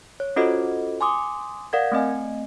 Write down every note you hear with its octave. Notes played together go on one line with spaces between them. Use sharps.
C#5
C#4 F4 F#4 A4 C5 D#5
G#5 C6 D6 D#6
A#4 D5 F5 F#5 G#6
A3 C4 D#5 G#5